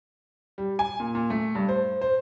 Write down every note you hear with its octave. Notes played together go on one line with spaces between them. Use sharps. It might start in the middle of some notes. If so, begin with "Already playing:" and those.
G3
G#5
A#2
A#2
A3
G2
C5
C5